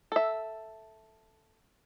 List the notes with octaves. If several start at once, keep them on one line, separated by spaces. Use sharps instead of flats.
A4 E5